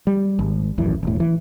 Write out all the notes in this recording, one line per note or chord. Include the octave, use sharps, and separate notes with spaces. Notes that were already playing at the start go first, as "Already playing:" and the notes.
G3
G#1
D#1 A1 F#2 E3
E1 A2
E3